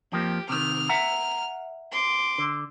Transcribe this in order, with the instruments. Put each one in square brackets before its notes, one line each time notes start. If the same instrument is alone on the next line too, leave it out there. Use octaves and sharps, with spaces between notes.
[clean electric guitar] F2 F3 A#3 [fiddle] G4
[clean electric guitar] C3 D#3 [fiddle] F6
[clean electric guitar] E5 F#5 A#5
[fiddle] C6 D6
[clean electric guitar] D3